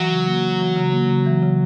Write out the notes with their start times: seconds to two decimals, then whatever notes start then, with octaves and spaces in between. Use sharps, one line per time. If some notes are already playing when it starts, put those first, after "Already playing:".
Already playing: E3 F#3
0.10 C#3
0.27 A#3
0.43 C#3
0.60 E3
0.76 C#3
0.93 A#3
1.10 C#3
1.26 E3
1.43 C#3